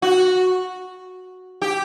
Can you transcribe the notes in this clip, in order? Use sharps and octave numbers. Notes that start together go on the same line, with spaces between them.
F#4
G4